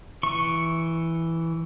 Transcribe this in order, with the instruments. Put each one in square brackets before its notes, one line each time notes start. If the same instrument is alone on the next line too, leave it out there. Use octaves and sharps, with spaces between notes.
[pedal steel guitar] E3 C#6